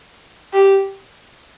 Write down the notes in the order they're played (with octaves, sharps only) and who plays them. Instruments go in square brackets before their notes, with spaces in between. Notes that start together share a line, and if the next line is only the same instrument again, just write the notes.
[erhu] G4